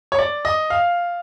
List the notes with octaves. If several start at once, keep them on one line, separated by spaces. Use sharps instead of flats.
C#5
D5
D#5
F5